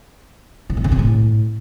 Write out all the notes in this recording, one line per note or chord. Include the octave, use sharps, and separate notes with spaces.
C#3
A#2
C#3
C3
A2